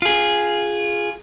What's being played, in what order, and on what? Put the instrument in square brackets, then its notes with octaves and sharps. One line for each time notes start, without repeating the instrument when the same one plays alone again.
[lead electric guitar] F4 G#4